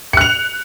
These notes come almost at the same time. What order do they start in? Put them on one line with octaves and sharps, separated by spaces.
C#7 F#6 F7